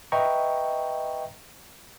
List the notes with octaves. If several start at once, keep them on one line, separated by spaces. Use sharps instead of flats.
B4 D#5 E5 G5 A#5 C#6